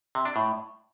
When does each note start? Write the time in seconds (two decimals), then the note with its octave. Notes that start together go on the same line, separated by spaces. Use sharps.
0.15 C3
0.25 D4
0.36 A2